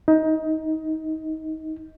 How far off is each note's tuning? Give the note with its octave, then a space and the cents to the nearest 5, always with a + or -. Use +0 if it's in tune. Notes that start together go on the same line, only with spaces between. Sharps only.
D#4 +20